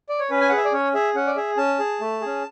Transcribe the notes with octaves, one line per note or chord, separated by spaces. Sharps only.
D5
C#5
C#4 B4
G#5
F#5
G#4
E5
D5
C#4 C#5
G#4 E5
C#4 F#5
D5
G#4 E5
C#4 A5
G#4
A3
C#4 G#4